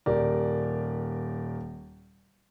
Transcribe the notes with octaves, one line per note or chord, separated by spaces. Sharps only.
D#1 G4 A#4 D5